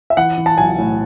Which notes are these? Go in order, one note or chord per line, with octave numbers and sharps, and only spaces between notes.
E5
E3 F#5
E3
A5
B1 G#5
A2